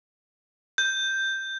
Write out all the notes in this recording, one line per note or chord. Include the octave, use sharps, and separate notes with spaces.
G6